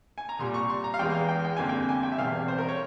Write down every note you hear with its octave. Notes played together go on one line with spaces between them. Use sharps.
G#5
A#5
C2 A#2 G3 C6
C#6
C6
A#5
F5
E2 E3 G#3 G5
F5
G5
G5
G1 F2 C3 G3 A#3 G#5
G5
G#5
G5
E5
E1 E2 C3 G3 F5
C5
A#4
C#5